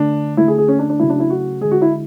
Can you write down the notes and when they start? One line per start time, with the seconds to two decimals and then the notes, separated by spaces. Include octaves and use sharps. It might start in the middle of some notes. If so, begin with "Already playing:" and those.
Already playing: D3 A3 D4
0.37 D3 A3 E4
0.48 G#4
0.58 G#4
0.68 C#4
0.79 D4
0.90 D4
0.99 C#3 F#3 A3 E4
1.10 D4
1.20 E4
1.30 F#4
1.61 D3 G#3 G#4
1.72 F#4
1.82 E4